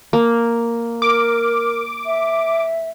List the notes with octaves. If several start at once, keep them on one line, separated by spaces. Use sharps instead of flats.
A#3
A#4 D6
E5